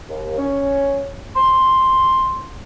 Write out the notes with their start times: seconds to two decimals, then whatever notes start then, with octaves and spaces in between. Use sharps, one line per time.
0.09 D#2
0.38 C#4
1.35 C6